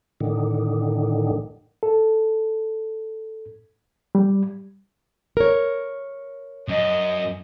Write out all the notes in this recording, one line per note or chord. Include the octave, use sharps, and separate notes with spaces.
A2 D3 D#3
A4
G3
A#4 C#5
F#2 D#5